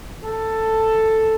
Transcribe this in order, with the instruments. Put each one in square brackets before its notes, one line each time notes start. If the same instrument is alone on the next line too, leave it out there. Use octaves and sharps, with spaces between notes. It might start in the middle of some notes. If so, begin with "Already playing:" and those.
[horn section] A4